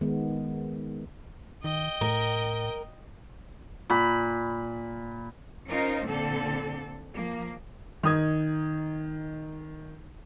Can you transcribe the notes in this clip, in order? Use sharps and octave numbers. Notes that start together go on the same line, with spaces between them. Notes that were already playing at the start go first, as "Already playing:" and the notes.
D#3 G#3 B3
D#3 D#5 G5
A2 A#4
A#2 B5
C#4 D#4 F4 A#4 C5
A#2 D3 A#3 C4 A4
F3 A#3
D#3 D#4 D#6 G#6